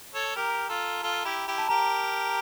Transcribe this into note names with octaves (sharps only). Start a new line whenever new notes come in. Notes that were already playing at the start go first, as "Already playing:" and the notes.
A4 C#5
G4 A#4 A#5
F4 A4
F4 A4
E4 G4
E4 G4
A5
G4 A#4 A#5